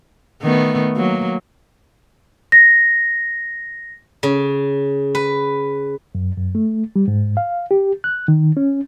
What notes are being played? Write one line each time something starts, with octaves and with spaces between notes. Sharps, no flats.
D#3 A3 B3
F#3 A#3
A#6
C#3
B4
F#2
F#2
A3
G3
G#2
F5
G4
F#6
D#3
C#4